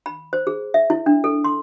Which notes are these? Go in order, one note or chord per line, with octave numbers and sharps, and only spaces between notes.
B5
C5
G#4
E5
E4
D4
A4
C6